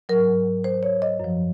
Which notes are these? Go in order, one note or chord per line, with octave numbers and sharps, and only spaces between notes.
G#2 F#3 A#4
C5
C#5
D#5
F#2 F3